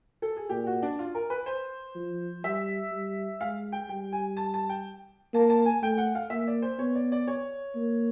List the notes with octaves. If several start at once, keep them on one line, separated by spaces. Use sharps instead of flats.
A4
G#4
A#2 G4
F#4
D4
F4
A#4
B4
C5
F3
G3 E5
G3
G#3 F5
G5
G3 G5
G#5
A5
A5
G5
A#3 A5
A5
G#5
A3 G5
F#5
F5
A#3 E5
D5
C5
B3 C#5
D5
D5
C#5
A#3